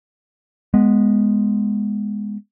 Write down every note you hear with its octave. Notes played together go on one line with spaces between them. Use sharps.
G#3 B3